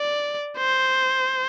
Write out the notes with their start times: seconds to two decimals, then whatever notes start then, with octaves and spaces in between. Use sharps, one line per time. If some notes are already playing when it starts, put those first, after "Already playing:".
Already playing: D5
0.58 C5